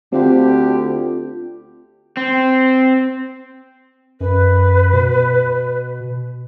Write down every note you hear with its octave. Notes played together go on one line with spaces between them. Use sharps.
D2 D3 C4 F4 G4
C4
F#2 B4
B2